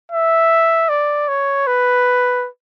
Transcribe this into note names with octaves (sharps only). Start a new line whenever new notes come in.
E5
D5
C#5
B4